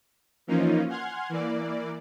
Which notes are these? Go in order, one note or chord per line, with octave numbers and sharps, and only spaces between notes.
E3 F3 A#3 C#4 D#4 F4
F#5 G#5 C6 F6 G#6
E3 A#3 D5